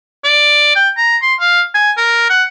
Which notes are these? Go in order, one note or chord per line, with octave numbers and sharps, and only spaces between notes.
D5
G5
A#5
C6
F5
G#5
A#4
F#5